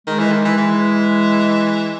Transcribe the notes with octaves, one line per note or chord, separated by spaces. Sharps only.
D#3 G#3
E3
D#3
E3
E3